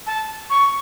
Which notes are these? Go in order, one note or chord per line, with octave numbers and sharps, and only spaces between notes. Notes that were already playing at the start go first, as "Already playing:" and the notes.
A5
C#6